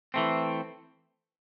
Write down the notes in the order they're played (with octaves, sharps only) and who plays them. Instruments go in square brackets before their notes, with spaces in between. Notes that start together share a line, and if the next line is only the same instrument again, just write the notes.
[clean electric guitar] E3 A3 C4